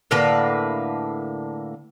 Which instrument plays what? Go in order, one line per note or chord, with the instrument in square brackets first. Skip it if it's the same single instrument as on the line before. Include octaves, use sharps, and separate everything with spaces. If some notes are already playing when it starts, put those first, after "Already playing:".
[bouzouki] A2 D3 A#3 B4